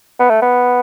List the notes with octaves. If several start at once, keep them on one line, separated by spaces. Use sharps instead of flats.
B3
A3
B3